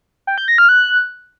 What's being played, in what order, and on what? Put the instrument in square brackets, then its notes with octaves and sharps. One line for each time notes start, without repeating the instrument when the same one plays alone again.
[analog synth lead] G5
G6
A#6
F6
F#6